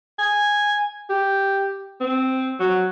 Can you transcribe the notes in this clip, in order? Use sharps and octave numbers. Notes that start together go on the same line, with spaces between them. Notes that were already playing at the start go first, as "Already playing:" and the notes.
G#5
G4
C4
F#3